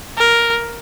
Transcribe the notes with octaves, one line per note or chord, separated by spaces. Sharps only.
A#4